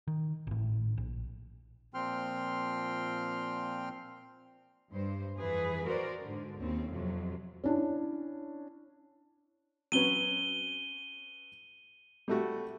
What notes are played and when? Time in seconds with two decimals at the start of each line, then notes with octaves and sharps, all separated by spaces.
0.07 D#3
0.47 G#1 A2
0.98 A#1
1.94 A#2 F3 C4 G5 C6 F6
4.92 G2 C5
5.38 F2 E3 G#4 B4
5.86 F#4 A#4 C5 D5
6.21 G#2 D3
6.59 D#2 C4 C#4
6.91 F2 C3 F#3
7.64 C#4 D4 E4
9.92 F#3 C#4 B4 D#7 G7
12.28 G3 A3 F#4